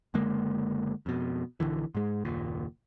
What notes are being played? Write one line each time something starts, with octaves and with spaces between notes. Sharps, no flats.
F#1 D3 G#3 A#3
F2 B2
A#1 D#2 D3 E3
G#2 G#3
F#1 D#2 A#2